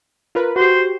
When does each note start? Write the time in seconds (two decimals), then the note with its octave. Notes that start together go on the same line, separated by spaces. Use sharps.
0.35 F4 A#4 B4
0.56 F#4 G4 C5